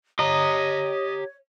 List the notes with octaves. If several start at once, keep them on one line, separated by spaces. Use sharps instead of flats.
G4 C#5 D#5 A#5